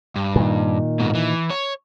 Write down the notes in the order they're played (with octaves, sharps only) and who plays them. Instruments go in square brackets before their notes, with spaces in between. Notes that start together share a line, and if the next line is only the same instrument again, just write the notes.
[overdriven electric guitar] G2
[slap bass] A#2 D#3
[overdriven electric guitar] G#2 B2
E3
C#5